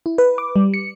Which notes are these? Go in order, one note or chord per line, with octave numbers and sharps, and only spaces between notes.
E4
B4
D6
G3
C#7